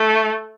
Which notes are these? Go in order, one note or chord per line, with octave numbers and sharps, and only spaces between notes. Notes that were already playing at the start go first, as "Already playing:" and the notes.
Already playing: A3